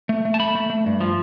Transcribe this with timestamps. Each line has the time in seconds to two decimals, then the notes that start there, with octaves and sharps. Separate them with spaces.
0.09 A3
0.25 A3
0.34 A5
0.40 A3 B5
0.55 A3
0.70 A3
0.86 G2
1.00 F3